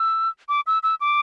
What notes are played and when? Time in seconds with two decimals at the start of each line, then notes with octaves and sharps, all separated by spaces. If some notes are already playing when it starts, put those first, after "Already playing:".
Already playing: E6
0.49 D6
0.67 E6
0.83 E6
1.01 D6